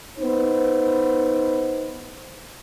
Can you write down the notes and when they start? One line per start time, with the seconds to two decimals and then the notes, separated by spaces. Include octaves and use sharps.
0.19 B3 D#4 B4 C5